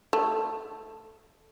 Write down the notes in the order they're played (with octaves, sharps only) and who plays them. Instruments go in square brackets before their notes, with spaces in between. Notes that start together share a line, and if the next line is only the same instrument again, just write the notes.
[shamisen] A3